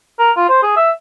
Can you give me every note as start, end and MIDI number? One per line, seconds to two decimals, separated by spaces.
0.19 0.31 70
0.37 0.49 65
0.49 0.60 72
0.63 0.76 68
0.77 0.91 76